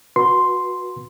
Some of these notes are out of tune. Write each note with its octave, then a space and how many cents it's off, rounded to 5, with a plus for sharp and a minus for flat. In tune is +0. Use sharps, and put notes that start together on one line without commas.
F#4 -20 B4 -25 C6 +0